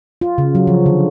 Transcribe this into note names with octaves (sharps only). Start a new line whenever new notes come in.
F4
C#3
F#3
F3
D3